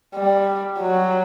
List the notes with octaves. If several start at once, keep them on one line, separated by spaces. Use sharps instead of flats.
G3
F#3